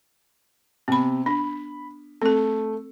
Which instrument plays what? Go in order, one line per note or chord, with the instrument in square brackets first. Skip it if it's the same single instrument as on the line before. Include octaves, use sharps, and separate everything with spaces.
[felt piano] C3 [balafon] B3 B5
[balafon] D4 [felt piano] B5
[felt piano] A3 [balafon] C4 A4